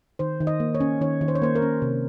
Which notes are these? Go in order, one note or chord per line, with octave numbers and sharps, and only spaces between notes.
D#3 C5
D#3
D#5
A#3
C#5
C#4
D#3 C#5
D#3
C5
C#5
A#3 C5
A#4
C#4
C3